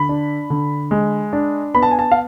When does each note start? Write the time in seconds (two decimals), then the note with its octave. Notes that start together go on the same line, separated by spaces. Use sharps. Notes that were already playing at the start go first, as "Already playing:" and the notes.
Already playing: D3 B5
0.09 D4
0.50 D3
0.91 G#3
1.33 D4
1.75 B3 B5
1.83 A5
1.91 G#5
1.99 A5
2.11 F5